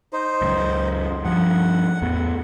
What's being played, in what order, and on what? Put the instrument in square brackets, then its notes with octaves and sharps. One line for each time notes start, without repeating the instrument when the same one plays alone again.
[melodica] D#4 C5
[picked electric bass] C#2 F#2
[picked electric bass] G2 F3 [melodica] F#5
[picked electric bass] E2 A2 B3